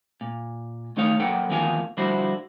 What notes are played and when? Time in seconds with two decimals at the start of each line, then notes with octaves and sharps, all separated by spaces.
0.21 A#2
0.97 D#3 A3 D#4 C#5 F5
1.20 F#3 A#3 A4 B4 F#5 G5
1.50 E2 D#3 F3 A#3 F5 G#5
1.97 D3 F3 G3 E4 F#4 C5